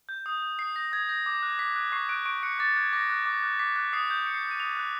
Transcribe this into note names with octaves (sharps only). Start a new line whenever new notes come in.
G6
D#6
G6
D#6 C7
G6 A#6
D#6 G#6
G6 A#6
D6
F#6
D6 B6
F#6
C#6 C7
F#6 D7
C#6 D7
F#6 C#7
D6 A6
F#6 G#6
D6 A#6
F#6
D6
F#6
D6 B6
F#6
D#6 C7
G6
D#6 C#7
C7
G6
D#7
D#6 F7
F#6